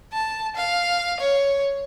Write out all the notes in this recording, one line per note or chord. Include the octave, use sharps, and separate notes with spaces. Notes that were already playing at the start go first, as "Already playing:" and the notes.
A5
F5
C#5